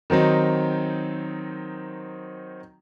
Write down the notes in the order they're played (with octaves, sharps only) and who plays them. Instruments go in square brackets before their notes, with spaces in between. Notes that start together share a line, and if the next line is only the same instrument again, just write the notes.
[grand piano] D#3 F#3 C4 D#4